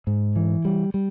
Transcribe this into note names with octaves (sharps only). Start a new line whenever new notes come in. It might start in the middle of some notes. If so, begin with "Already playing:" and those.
G#2
E3
G3
G3